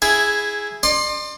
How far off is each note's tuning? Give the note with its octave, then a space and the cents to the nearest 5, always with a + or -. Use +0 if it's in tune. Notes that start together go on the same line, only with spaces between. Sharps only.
E4 +0 G#4 +0
D5 +40 C6 +25